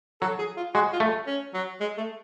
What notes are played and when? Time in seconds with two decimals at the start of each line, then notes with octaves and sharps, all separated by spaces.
0.22 F#3 A4
0.38 G#4
0.57 F4
0.74 G#3 F#4
0.93 F4
1.00 A3
1.27 C#4
1.54 F#3
1.80 G#3
1.97 A3